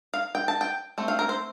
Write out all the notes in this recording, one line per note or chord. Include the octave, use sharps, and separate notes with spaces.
F5
G5
A5
G5
A3 C4
F5
A#4
C5